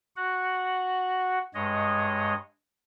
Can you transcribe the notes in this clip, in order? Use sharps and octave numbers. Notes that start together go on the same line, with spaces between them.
F#4 F#5
G2 G#3 C#5 D#5